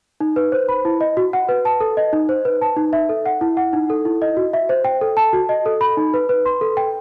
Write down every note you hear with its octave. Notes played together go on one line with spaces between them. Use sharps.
D#4
B4
C5
B5
E4
D#5
F#4
F#5
B4
A5
A4
D#5
D#4
C5
B4
A5
D#4
E5
A4
F#5
E4
F#5
D#4
A4
E4
D#5
F#4
E5
C5
G5
A4
A5
F#4
D#5
A4
B5
D#4
B4
B4
C6
A4
G5